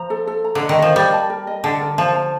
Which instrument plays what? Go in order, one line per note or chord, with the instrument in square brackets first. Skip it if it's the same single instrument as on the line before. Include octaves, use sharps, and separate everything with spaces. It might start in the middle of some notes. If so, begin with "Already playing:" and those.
Already playing: [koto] F3 [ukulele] A#5
[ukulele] A4
A4
A#5
[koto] D3
[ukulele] D#5
[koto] D#3
[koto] F3 [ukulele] D#5
[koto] G3 [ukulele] A#4
[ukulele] A5
A#4
D#5
[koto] D3 [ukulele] A5
[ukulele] A#4
[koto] F3 [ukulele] A5
[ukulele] A5